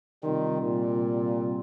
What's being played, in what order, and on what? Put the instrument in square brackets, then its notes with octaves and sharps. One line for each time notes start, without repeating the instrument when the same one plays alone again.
[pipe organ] C3 G3 C4 F4 [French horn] D#3
[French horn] A#2